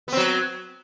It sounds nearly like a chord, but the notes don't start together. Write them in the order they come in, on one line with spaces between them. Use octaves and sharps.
B3 C4 F#3